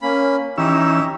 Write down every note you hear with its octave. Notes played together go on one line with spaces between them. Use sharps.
A#3 C#4 B5
E3 C#4 D#4 G4 E6